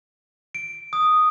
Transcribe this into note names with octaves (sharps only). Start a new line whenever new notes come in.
D7
D#6